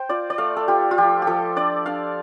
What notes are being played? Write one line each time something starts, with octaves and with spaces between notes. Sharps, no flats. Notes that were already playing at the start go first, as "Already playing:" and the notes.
Already playing: C5 G5
F4 D5
D5
A3 F5
A4
F4 G4
F4
F3 G4
G4
F3 A4
D4 D5
D4 F5